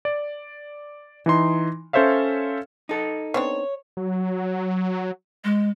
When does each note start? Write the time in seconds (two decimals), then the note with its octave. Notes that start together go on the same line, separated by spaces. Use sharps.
0.05 D5
1.26 E3 D#4 C6
1.93 C#4 A4 C5 C#5 E5 F5
2.89 D#4 A4
3.34 B3 C4 D4 C#5
3.97 F#3
5.44 G#3